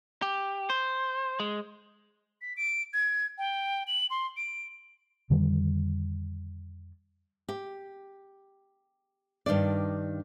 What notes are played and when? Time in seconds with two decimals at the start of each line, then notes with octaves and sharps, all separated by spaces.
0.22 G4
0.70 C5
1.40 G#3
2.41 B6
2.57 D7
2.93 G#6
3.38 G5
3.87 F#7
4.10 C6
4.37 D7
5.30 F2 D3 D#3 G3
7.49 G4
9.46 G2 D#3 D4 D5